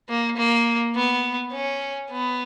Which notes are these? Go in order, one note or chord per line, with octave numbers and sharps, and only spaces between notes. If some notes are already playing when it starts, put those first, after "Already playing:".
A#3
A#3
B3
C#4
B3